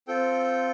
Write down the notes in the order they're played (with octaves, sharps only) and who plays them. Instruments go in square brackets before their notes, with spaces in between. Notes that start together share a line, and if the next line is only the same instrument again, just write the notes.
[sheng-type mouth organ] C4 F4 A4 G5